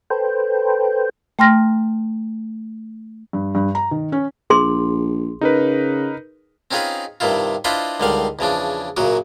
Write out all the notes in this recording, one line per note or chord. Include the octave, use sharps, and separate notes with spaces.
A4 B4 C5 G5
A3 G5 C6 F6 A#6
G2
G2
A#5
D#3
C#4
A#1 G#4 C6
C#3 D#4 A#4 B4
C4 C#4 D#4 F4 G#4 B4
G2 C3 D#3 E4 F4
D4 E4 F4 B4 C5 D#5
C#2 D3 D#3 G3 F5
E2 C#3 F3 D4
F#2 A#2 C#3 F#3 F#4